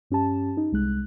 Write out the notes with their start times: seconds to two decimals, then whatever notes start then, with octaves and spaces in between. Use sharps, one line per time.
0.10 G2 C#4 G4 A5
0.57 D#4
0.72 C2 G#3 F#6